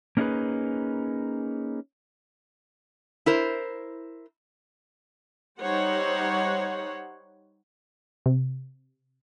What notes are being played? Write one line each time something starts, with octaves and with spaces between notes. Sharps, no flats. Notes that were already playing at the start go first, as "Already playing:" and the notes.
A#3 C#4 D#4 E4 G#4 B4
E4 A#4 C5
G3 D#4 C5 C#5 F#5
C3